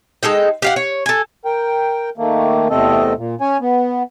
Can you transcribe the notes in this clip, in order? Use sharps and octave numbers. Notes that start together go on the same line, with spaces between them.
G#3 D#4 A4 G5
G4 F5 F#5
C#5
A4 G#5
A#4 G5
D#3 A3 A#3
E2 C3 A3 C4 A4 D#5
A#2
C#4 C#5 G#5
B3